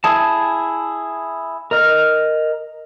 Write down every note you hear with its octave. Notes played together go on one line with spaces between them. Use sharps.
E4 G#4 A5
A#4 D#5 F6